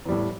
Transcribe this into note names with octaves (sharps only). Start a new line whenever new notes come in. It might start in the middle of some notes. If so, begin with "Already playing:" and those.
E2 A2 G3